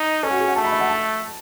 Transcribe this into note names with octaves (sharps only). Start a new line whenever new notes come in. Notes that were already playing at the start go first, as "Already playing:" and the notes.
Already playing: D#4
C#4 A4
F#4
G#4
F#5
A3 A5
B5
E5
F#5
A5